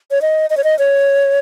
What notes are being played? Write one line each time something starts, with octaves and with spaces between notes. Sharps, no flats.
C#5
D#5
D#5
C#5
D#5
C#5